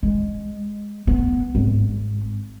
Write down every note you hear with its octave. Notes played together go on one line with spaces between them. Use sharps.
G#3
B3
G#1